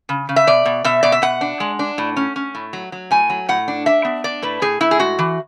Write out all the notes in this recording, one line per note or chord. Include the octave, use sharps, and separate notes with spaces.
C#3
C#3
E5
B2 D5
B2
B2 E5
B2 D5
E5
B2 F#5
D4
G#3
D4
A2
C#4
C#4
A2
F#3
F#3
A2 G#5
F#3
A2 F#5
D4
D4 E5
B3
D4 D5
A2 B4
A2 G#4
A2 E4
G#4
G#3 F#4
E3